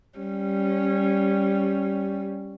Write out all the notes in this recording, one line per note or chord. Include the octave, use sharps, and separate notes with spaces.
G3 C#4